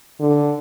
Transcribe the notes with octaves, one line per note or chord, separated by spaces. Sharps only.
D3